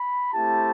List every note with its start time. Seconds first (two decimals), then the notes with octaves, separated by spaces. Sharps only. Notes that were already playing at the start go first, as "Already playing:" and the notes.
Already playing: B5
0.32 A3 C4 E4 G4 A5